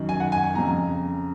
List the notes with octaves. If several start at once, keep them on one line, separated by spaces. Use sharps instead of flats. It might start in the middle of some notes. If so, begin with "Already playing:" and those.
Already playing: F#2 D#3
G#5
F#5
G#5
G#5
F2 C#3 A#5